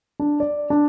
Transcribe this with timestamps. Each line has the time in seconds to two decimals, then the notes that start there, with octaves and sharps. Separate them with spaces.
0.20 D4
0.40 D5
0.70 D4